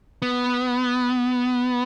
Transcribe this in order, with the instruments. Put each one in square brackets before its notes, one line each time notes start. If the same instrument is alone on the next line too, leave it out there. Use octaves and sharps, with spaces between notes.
[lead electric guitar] B3